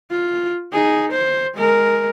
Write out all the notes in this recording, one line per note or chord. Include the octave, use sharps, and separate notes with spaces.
F4
D#4 G#4
C5
G#3 A#4